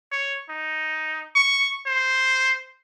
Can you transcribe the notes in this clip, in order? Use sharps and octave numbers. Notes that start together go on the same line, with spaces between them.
C#5
D#4
C#6
C5